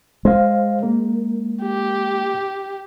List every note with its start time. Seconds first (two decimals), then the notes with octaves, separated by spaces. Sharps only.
0.25 G#3 C5 F5
0.83 A#3 A#4
1.62 G4